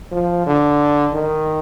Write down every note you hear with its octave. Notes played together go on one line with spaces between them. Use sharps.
F3
D3
D#3